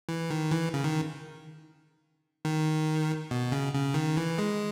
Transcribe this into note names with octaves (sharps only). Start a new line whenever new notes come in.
E3
D#3
E3
C#3
D#3
D#3
B2
C#3
C#3
D#3
E3
G#3